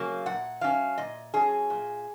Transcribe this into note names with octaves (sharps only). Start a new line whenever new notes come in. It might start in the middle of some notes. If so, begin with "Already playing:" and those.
Already playing: C#3 F#3 A#3
A#2 F#5
F#3 C#4 F5
A#2 D#5
F#3 C#4 G#4
A#2